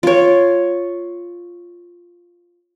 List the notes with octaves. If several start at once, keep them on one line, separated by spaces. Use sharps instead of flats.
F4 C#5